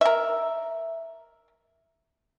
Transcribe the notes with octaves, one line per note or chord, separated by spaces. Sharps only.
A#4 E5